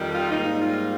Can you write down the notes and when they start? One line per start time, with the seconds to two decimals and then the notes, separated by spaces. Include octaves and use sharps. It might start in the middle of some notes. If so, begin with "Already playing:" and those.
Already playing: F2 D#3 G3
0.12 F4
0.31 G#2 G3 A#3 D#4
0.59 F4